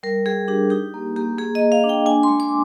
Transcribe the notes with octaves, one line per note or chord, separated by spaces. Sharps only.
G3 A#4
G3 G#4
D4 G4
D#4 G4
A#3
A#3 G4
A#3 G#4
D#5
A#3
F5
D4
G5
D4 G#5
C6
G#3
D6